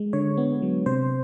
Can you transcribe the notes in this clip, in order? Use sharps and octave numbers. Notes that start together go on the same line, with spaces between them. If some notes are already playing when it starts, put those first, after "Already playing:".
Already playing: G#3
D3 C#5
B3
F#3
C3 C5